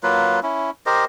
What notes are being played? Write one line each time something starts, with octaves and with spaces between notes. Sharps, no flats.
F#3 A#3 F4 B4
C#4 E4
G4 A#4 C5 D#5